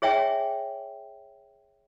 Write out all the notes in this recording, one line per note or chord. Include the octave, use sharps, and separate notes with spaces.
G#4 C#5 E5 G5 G#5